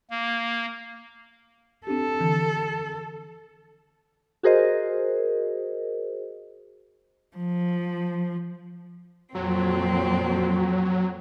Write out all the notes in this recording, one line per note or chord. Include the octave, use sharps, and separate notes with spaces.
A#3
C4 D4 G4 A4
D3 E3
F#4 G#4 A#4 C5 D#5
F3
F2 A#2 F#3 C4